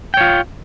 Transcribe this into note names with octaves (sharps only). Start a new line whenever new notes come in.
F4 C#5 G5